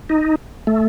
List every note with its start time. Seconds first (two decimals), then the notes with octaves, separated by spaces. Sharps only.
0.10 D#4
0.67 A3